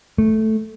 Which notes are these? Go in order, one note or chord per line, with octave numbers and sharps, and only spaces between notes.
A3